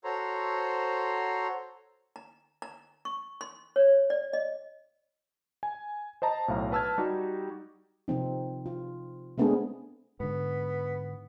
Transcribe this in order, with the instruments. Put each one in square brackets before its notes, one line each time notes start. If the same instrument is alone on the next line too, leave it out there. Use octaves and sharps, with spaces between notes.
[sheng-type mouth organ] F#4 A4 C5 C#5 A#5 C6
[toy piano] A#5
A#5
C#6
C6
C#5
D5
D#5
[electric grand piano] G#5
C5 D#5 A5 A#5
B1 A2 F5 A#5
B4 A5 E6 F6 G#6
G3 D#4 F#4 G4
[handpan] C3 F3 C4 D#4
F4
G#3 A3 B3 C4 D4 G#4
[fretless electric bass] G#2 D3 [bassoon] B3